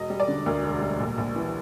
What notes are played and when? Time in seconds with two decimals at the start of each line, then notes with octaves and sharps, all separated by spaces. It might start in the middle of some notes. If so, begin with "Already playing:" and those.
Already playing: E1 D#5
0.10 G3
0.20 D5
0.28 D3
0.46 D2 A#4
0.63 E1
0.81 G3
1.00 A#1
1.18 A#1
1.36 E3